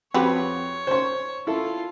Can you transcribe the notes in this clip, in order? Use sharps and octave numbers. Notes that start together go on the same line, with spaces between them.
F2 F#4 G4 B4 C#5
C5 C#6
E4 F4 A4